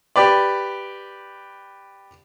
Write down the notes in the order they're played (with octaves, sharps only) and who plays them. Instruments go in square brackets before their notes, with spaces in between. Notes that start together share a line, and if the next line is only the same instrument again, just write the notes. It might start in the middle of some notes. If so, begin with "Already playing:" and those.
[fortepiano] G4 B4 D5